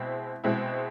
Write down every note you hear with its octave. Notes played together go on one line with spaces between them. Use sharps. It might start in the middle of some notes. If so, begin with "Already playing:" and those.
Already playing: B2 G#3 C4 E4
B2 G#3 C4 E4